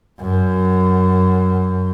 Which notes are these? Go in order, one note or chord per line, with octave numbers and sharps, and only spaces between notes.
F#2